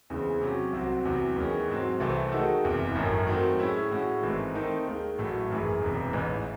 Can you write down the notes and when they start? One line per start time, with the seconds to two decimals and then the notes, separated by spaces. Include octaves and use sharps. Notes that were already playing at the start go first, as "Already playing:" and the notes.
0.10 E2 C#3 G#3 C4
0.41 C3 F#3 C#4
0.73 C2 C3 F#3 C4 F#4
1.05 E2 C3 F#3
1.36 E2 D#3 G#3 C#4
1.68 G#2 F#3 C4
2.00 C2 C3 E3 A3 C4
2.32 D#3 G#3 D#4 F#4 A4
2.64 F#1 E2 C3
2.95 G#1 F#2 D#3 A3 C#4
3.27 D#3 F#3 A3 C4
3.59 A2 G#3 C#4 E4
3.91 A2 G#3 C#4 F#4
4.23 G#1 G#2 E3 A3 C4
4.55 D#3 A3 C4 D#4
4.87 D#2 D#3 G#3
5.18 A1 A2 F#3 A3
5.50 G#1 F#2 E3 G#3
5.81 E1 E2 C3
6.13 A1 G#2 E3